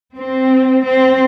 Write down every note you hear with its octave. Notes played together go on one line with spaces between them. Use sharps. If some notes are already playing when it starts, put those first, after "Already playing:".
C4
C4